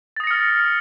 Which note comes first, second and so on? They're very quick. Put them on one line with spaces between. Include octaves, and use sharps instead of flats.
A6 D#6 A#6 C#7 F6